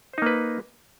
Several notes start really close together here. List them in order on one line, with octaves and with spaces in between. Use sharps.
C5 D#4 A#3 B4